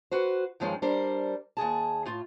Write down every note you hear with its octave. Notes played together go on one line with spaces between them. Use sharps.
F#4 B4 C5
G2 D#3 F3 G#3 C#4
G3 D4 A#4 C5
D#2 A#2 G#4 A5
A2 F4